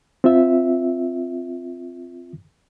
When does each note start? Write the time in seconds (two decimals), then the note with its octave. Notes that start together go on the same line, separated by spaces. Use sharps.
0.24 C4 F4 E5